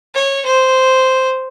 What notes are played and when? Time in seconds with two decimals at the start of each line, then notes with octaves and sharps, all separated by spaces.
0.15 C#5
0.46 C5